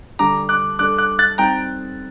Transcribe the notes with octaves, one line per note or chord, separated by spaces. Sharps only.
D3 G3 D4 A#5 D6
D6 F#6
G3 D4 A4 D6 F#6
D6 F#6
F#6 A6
G3 C4 D#4 G5 A#5